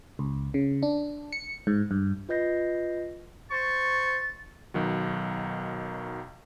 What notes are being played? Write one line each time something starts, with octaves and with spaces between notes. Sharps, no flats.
C#2
C#3
D4
C#7
G#2
G2
F4 B4 D#5 G6 A#6 C7
C5 C#6 A6
B1 D#3 F#3